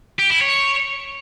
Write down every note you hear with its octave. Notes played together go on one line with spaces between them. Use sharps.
G4
E4
C#5